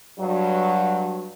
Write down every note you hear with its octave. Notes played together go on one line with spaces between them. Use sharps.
G2 F#3